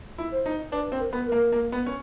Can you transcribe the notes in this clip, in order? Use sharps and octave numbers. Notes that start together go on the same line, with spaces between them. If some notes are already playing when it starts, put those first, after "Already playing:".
E4
C5
D#4
D4 B4
C4
A#4
B3
A#4
A#3
A#3
B3
C#4